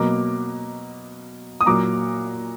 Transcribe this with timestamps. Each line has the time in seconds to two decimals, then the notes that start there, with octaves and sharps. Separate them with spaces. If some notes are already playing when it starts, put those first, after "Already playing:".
Already playing: B2 F#3 A#3 A#5 D6
1.61 D#6
1.66 A#2 F#3 A#3 A#5 D6